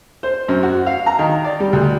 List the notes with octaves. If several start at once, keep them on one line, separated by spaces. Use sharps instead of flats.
C5
F#2
F#4
F5
A#5
D#3
D5
G3
D2